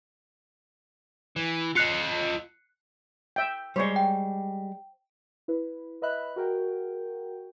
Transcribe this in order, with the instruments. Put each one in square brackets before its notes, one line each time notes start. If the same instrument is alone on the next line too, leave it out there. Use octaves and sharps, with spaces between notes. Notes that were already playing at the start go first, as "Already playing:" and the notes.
[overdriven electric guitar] E3
[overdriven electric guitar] F4 D#5 [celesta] F#6 C7 C#7
[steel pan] E5 G5
[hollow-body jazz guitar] G3 G#3 [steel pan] C5 C#5
[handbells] G5
[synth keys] E4 B4
B4 D#5 E5 B5 F#6
F#4 G#4 A#4 F#5 G5